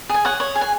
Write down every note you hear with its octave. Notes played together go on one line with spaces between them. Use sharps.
G#4 G#5
C#5 F#5
C#5
G#4
G#5